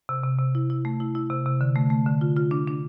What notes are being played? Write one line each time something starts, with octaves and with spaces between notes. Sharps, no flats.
C3
C3
C3
E4
E4
A3
E4
E4
C3
C3
D3
A3
A3
D3
F4
F4
D4
D4